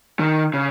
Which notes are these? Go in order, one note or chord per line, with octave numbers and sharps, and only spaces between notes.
D#3
C#3